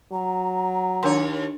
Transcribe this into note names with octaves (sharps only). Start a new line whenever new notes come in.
F#3 A#5
D#2 D4 A#4 C#5 C6